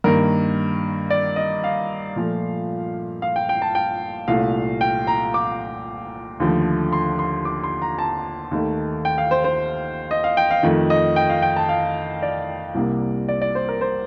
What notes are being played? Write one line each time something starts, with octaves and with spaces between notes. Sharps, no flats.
G2 D#3 A#3 A#4
D5
D#5
F5
A#2 F3 A3
F5
G5
G5
A5
G5
C2 A#2 A3 F5
G5
A#5
D6
D#2 D3 F3 A3
C6
C6
D6
C6
A#5
A5
D#2 D#3 A3
G5
F5
C5
C5
D#5
F5
G5
F5
F2 D#3 A3
D#5
G5
F5
G5
A5
F5
D5
C2 C3 G3 A#3
D5
D5
C5
A#4
C5